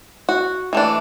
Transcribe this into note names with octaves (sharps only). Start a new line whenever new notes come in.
F#4
E3 A3 D4